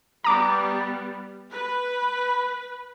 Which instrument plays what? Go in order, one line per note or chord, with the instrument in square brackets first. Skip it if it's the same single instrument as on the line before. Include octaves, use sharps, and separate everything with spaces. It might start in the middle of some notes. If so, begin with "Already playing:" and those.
[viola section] G3 B3 [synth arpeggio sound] A#5 D6
[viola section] B4